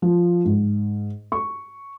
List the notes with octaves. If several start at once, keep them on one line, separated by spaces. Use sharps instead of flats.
F3
G#2
C#6